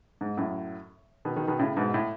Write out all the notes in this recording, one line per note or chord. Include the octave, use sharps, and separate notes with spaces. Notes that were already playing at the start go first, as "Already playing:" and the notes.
G#2
F#2 A2
B2 D#3
B2 D#3
B2 D#3
A2 C#3
G#2 B2
A2